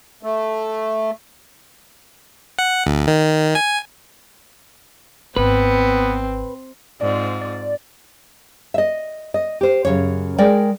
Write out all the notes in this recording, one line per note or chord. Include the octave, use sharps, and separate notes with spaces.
A3
F#5
D2
D#3
G#5
G#1 B3 C4 B4
G#2 C4 F4 D5
D5
D#5 E5
D#5
G4 C5
F#2 A#2 C#3 C#5
G#3 A#4 D5 G5